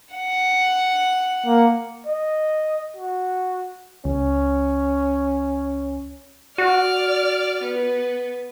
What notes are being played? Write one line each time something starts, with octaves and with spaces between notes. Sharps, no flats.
F#5
A#3
D#5
F#4
C#2 C#4
F#4 D5 F6
B3